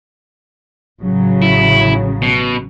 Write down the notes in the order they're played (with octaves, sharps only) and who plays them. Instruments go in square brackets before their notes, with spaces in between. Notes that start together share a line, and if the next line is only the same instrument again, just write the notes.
[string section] A1 C#3 F#3
[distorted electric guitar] E4
B2